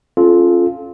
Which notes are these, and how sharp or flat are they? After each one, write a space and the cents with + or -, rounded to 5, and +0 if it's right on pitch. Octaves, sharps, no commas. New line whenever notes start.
C#4 -20 F4 +0 A4 -30